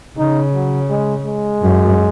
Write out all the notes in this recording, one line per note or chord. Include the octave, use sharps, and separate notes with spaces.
C#3 D#4
F#3
G#3
G#3
F#2